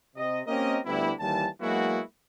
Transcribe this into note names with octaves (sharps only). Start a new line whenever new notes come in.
C3 D#5
A#3 C4 C#4 G4 A#4 D#5
D2 G3 B3 D4 E4
D#2 E3 G3 A5
F#3 G#3 A#3 B3 E4 F#4